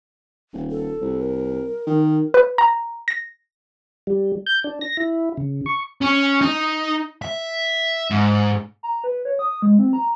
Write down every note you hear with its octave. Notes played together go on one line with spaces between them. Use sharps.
D#1
A4
C2
A#4
D#3
B4
A#5
A#6
G3
G6
D4
A#6
E4
C#3
C#6
C#4
D#4
E5
G#2
A#5
B4
C#5
D#6
G#3
C4
A#5